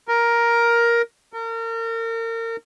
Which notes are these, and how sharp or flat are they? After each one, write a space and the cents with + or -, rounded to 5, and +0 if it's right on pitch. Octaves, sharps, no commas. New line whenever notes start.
A#4 +10
A#4 -35